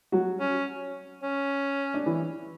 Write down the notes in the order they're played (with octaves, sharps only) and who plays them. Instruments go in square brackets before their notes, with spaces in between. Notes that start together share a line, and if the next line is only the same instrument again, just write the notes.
[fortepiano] F#3 F#4
[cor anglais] C#4
C#4
[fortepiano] D4
E3 E4